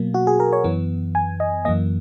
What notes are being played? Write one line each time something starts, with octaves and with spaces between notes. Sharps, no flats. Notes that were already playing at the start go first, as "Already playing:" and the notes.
Already playing: B2 F#3 A#3
F#4
G#4
A#4
C#5
F#2 E3 B3
G#5
D#5
F#2 E3 A#3 D#5